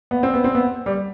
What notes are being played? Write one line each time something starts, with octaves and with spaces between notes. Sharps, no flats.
B3
C4
B3
C4
B3
G3